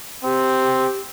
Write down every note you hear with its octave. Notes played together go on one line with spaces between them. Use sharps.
C4 G4